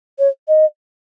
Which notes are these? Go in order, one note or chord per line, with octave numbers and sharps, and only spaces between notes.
C#5
D#5